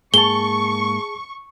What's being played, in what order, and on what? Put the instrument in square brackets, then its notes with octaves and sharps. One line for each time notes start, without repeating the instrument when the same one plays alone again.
[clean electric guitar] G#2 A#3 [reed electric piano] G#4 A5 [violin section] C#6 [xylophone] G7